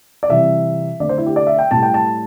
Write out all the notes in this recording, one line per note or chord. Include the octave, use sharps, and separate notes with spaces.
D5
C3 E3 G3 E5
D3 A3 D5
C5
E4
G4
D5
E5
G5
A2 G3 A5
G5
A5